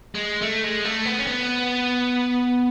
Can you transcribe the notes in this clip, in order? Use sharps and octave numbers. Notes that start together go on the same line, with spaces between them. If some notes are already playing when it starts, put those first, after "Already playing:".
G#3
A3
G#3
A3
B3
C#4
B3